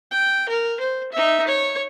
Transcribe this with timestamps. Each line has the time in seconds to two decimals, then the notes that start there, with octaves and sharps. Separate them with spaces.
0.11 G5
0.49 A#4
0.80 C5
1.12 D#4 E5
1.47 C#5